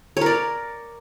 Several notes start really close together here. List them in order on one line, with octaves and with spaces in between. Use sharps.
C#5 A#4 D5